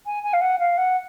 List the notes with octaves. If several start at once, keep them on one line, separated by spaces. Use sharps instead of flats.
G#5
G#5
F5
F#5
F5
F#5